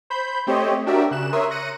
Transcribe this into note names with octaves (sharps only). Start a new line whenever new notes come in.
C5 B5 G6
A3 C4 G4 C5 C#5 D#5
D4 F#4 G4 A#4 D5 E5
C#3 F#6 E7
A#4 C#5 E5 C6 D#6
F#6 A#6 C#7 D#7